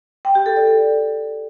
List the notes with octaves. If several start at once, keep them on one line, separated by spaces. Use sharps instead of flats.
G5
G4
A4
D5
A4